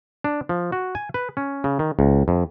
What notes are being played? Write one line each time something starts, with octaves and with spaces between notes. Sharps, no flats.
D4
F3
F#4
G#5
B4
C#4
C#3
D#3
C#2
F2